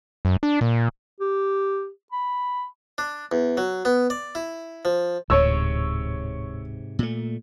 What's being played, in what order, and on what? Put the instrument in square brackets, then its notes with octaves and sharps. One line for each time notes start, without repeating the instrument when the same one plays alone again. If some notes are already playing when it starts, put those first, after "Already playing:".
[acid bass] F#2
D4
A#2
[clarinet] G4
B5
[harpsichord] D4
E2
F#3
B3
D5
E4
F3
[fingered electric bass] D1 [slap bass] G#2 C3 [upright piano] C#5 E6
[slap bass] A#2 A3